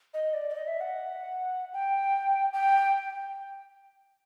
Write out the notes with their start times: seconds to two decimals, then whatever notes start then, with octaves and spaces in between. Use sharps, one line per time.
0.14 D#5
0.34 D5
0.50 D5
0.54 D#5
0.67 E5
0.81 F#5
1.73 G5
2.53 G5